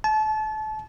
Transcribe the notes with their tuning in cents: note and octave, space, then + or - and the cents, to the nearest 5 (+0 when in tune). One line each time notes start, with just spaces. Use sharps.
A5 -30